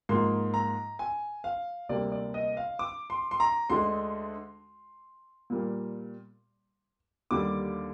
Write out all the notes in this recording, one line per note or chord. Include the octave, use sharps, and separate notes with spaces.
G#2 F3 A#3 C6
A#5
G#5
F5
D2 C3 G3 A#3 D5
D5
D#5
F5
D6
C6
C6
A#5
D2 D3 G#3 C6
A#2 G3 A#3
D#2 D3 G3 D6